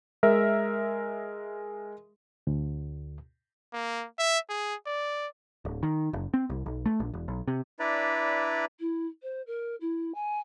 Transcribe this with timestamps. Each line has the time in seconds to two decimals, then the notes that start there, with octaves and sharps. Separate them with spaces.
0.23 G#3 A#4 E5
2.47 D2
3.73 A#3
4.19 E5
4.50 G#4
4.87 D5
5.65 D1
5.83 D#3
6.13 F#1
6.34 C4
6.50 C2
6.66 B1
6.86 A3
7.00 A#1
7.14 E1
7.28 B1
7.48 C3
7.80 D4 E4 B4 D5 A#5 B5
8.80 E4
9.22 C5
9.47 A#4
9.81 E4
10.14 G#5